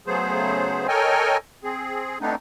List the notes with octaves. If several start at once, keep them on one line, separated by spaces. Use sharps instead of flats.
C#3 F#3 A3 B3 G#4 C5
A4 A#4 C#5 D#5 G5 G#5
C4 G#4
A3 B3 C4 D4 D#4